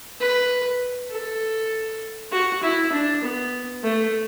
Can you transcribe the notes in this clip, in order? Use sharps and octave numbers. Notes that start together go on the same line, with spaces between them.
B4
A4
F#4
E4
D4
B3
A3